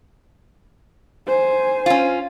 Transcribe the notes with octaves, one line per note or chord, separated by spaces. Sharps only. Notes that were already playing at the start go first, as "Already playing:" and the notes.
C5 G#5
C#4 F4